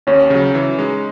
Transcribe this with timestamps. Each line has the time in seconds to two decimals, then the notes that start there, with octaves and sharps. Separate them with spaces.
0.07 D#2 C#4
0.30 C#3 F#3
0.55 E3
0.78 G#3 D#4